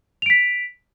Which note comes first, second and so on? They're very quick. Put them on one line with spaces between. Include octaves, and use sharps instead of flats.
F7 D7 B6